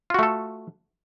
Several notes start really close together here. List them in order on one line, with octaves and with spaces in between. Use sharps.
F4 F#4 A3 A4